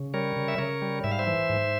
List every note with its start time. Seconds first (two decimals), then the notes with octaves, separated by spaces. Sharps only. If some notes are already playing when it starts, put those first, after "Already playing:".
Already playing: C#3
0.14 G3 A#4 C#5
0.36 C#3
0.48 E5
0.58 C#3 A#4 C#5
0.82 G3
1.04 G#2 E5
1.12 F5
1.19 C5 E5
1.27 E3
1.49 G#2